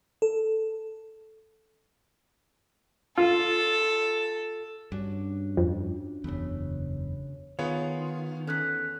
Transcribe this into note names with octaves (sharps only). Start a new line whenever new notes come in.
A4
F4 A4
G2 C#4 D4 F#4
F2
F#1 E2 C#3 A3 B3
D#3 B3 F4 G#4 C#5
E2 C#4 A4 F#6 B6